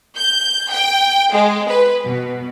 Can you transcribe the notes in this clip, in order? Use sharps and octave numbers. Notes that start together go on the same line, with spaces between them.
G6
G5
G#3
B4
B2